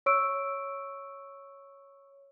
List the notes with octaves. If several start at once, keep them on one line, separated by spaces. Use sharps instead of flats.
C#5 C#6 E6 D7